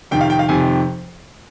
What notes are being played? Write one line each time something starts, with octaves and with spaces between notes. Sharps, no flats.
F2 C3 D#3 G5
F5
G5
F5
F2 C3 D#3 G#5